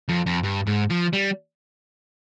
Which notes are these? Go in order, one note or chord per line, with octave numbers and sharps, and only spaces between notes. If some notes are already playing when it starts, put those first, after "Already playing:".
F2
F2
G2
G#2
F3
G3